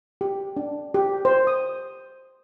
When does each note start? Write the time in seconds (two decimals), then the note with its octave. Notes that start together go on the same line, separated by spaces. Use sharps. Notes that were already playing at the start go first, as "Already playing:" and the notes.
0.21 G4
0.57 D4
0.94 G4
1.25 C5
1.47 D#6